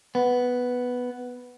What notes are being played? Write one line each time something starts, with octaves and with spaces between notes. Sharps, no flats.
B3